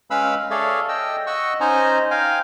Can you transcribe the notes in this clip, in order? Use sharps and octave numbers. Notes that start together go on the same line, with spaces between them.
G#3 C#4 B4 F5 B5 E6
G#4 A4 C#5 D5 E5 F5
D#5 G5 E6
D#5 F#5 C#6 E6
C#4 D#4 C5 D#5 G#5 A#5
F5 G5 G#5